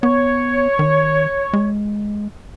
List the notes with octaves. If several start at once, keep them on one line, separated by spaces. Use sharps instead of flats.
B3 C#5
D#3
G#3